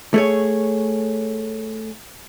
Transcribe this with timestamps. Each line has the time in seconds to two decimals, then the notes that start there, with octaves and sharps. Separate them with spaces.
0.14 A3 G#4 C#5